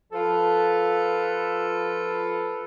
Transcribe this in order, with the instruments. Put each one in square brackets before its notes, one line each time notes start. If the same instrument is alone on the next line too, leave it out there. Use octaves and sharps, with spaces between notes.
[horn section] F3 F4 A4 B4